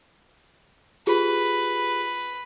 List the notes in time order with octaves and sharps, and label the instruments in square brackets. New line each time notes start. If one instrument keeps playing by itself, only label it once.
[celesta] F4 G4 G#4 [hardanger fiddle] B4